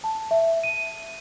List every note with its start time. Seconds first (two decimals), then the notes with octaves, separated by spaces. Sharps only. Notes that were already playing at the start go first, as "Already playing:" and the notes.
0.04 A5
0.31 E5
0.64 D#7